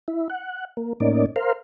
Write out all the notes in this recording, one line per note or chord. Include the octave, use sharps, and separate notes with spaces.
E4
F#5
A#3
A2 A#3 C#4 D#4 D5
A#4 C5 F5